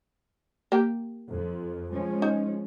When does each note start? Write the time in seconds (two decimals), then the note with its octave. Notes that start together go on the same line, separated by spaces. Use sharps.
0.72 A#3 G4 G5
1.30 F2 F3
1.92 F3 G#3 C#4
2.22 D#4